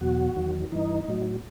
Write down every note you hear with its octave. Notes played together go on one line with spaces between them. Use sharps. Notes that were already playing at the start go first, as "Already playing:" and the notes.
E2 B2 F#3 F#4
E2 D#3 F#3
G2 E3 D#4
A2 F#3